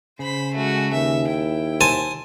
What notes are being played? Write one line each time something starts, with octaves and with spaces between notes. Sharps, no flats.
C#3 C5 B5
G#3 A3 F#4
D#2 E5
E4 G5
C5 G#5 A5